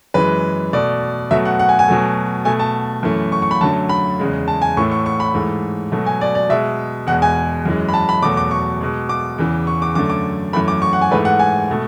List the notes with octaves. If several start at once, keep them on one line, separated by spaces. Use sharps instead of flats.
F#2 E3 G#3 B4
B2 A3 D5
B2 F#3 A3 E5
F#5
F#5
G#5
G#5
B2 F#3 A3
B2 A3 G#5
A5
F#2 E3 A3
C#6
C#6
B5
F#2 D3 F#3 A3 A5
B5
E2 C#3 G#3
A5
G#5
A2 E3 A3 C#6
C#6
C#6
B5
G#2 E3 A3
B2 F#3 A3
G#5
D5
D5
B2 G#3 E5
E2 B2 G#3 F#5
G#5
F#2 E3 G#3
B5
A5
B5
E2 B2 F#3 A3 D6
D6
C#6
B2 G#3
D6
E2 C#3 E3
C#6
D6
F#2 D3 A3 D6
D6
F#2 E3 A3 B5
D6
C#6
F#5
G#5
G#2 E3 A3 B4
F#5
G#5
B2 A3